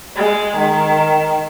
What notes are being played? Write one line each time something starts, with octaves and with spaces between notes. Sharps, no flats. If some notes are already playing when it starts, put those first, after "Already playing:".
G#3
D#3